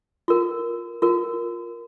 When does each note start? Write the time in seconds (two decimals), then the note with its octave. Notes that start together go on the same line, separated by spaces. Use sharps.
0.28 F4 A#4
1.02 F4 A#4